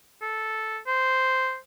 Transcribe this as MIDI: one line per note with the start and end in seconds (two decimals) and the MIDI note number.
0.22 0.78 69
0.87 1.57 72